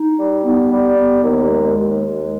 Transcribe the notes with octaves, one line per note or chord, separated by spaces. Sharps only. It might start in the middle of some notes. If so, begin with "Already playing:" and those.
Already playing: D#4
G3
B3
G3
B3
D#2
G#3
D#2
G#3